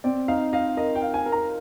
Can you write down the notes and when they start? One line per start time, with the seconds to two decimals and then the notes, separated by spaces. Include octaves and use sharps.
0.04 C4 D5
0.28 D#4 F5
0.53 D#5 F5
0.77 A#4 D#5
0.95 G5
1.02 F5
1.14 G#5
1.26 A#4
1.32 A#5